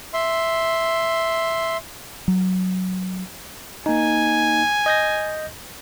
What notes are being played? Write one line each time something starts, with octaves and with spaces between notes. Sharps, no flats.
E5 C6
F#3
A#3 D#4 G#5
D#5 G6 A#6